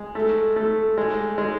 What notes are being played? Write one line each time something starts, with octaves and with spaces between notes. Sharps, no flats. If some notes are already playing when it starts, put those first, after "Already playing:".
Already playing: G#3
A3
A3
G#3
G#3